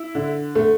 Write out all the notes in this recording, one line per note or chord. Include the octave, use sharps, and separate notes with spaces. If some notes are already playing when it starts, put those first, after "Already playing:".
Already playing: E4
D3
A3